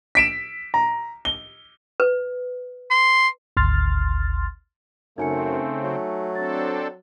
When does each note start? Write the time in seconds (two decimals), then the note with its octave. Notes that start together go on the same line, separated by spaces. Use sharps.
0.15 B6 D7 E7
0.74 A#5
1.25 G7
2.00 B4
2.91 C6
3.57 G#1 D2 C6 F6 A6
5.18 F#2 C#3 A3 C4 D#4 G#5 C#7
5.84 F#3
6.35 C4 D4 A4 A6